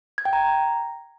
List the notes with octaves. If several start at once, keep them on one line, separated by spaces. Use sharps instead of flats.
G#6
G5
A#5